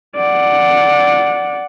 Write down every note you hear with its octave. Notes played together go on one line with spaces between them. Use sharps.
D5 F#5